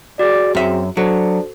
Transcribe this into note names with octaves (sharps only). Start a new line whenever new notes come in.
F#4 G#4 D5
F#2 C4 E5
F#3 D4 F#4 A4 C5